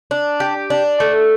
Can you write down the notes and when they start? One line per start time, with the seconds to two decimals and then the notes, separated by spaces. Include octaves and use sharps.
0.11 D4
0.40 G4
0.70 D4
1.00 A3